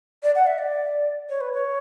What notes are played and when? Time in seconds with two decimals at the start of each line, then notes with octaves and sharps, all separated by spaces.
0.23 D5
0.35 F#5
0.47 E5
0.58 D5
1.29 C#5
1.41 B4
1.54 C#5